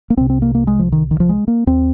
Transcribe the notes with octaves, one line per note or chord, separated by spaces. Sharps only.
A#3
C2 C3 C4
C4
A#3
A#3
G#3
F3
D#3
D#3
F3
G#3
A#3
D#2 C4